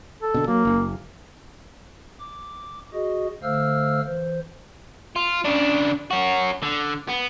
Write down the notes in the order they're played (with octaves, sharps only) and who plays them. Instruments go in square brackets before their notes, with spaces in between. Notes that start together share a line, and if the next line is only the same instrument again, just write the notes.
[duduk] A4
[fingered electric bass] B2 D3
[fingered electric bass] F#3 [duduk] A#3
[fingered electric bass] F#1
[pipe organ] D6
F#4 G#4 D#5
D3 A3 C5 F5 E6 F6
E3 C5
[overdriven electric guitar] F4
C#3 D4
C#4 F#4
D3
B3